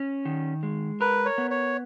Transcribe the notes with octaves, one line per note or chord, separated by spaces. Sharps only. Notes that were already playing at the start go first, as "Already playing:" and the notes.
Already playing: C#4
D#3
G#3
A#4 B4
C#5
B3
C#5